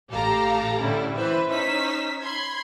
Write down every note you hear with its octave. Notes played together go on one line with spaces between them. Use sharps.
A1 G4 A4 F5 A#5
A2 D3 G3 C#4 E4
E3 E4 B4 C5 E5
C#4 D#4 C5 E6 B6
B5 C6 G#6